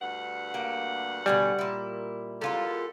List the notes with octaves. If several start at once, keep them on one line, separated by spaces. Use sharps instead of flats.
D2 G2 F#5
A#3 G4
B2 D3 G3 G#5
A#2 E4
E2 G#3 F4 G4 A4 A#4